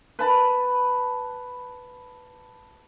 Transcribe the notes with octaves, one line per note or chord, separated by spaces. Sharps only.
B4 A5 B5